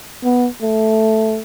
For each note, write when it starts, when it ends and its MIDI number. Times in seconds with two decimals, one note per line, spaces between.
0.24 0.47 59
0.62 1.41 57